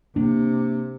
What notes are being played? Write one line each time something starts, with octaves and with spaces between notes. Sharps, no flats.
C3 A#3 D4